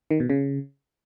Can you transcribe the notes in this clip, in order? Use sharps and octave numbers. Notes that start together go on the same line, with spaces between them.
D#3
B2
C#3